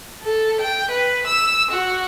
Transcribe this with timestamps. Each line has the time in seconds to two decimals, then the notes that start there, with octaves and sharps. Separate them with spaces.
0.23 A4
0.61 G5
0.91 B4
1.27 E6
1.71 F#4